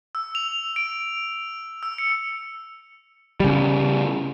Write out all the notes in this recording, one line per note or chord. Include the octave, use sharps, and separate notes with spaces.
E6
F7
D7
E6
C#7
C#3 G3